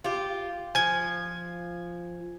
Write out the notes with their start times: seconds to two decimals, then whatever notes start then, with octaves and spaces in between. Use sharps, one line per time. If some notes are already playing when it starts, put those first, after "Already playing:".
0.04 F4 G4
0.75 F3 G#5 G#6